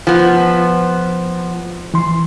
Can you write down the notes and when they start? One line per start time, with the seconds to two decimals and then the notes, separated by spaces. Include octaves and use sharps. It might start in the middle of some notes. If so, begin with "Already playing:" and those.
0.07 F3 B3
1.94 E3 C6